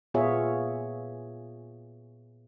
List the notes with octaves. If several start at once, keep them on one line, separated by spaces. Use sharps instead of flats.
A#2 B3 F4 G#4 C#5 E5